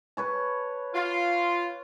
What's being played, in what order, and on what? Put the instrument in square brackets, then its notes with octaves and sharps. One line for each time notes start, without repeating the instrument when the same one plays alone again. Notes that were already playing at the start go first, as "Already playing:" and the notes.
[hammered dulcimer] B4 C#5 A5
[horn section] F4